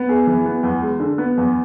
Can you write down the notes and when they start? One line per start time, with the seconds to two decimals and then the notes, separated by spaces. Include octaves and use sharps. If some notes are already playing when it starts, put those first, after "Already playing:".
Already playing: B3
0.09 G#4
0.27 E3
0.46 B3
0.63 E2
0.82 G#3
1.00 D3
1.18 B3
1.38 E2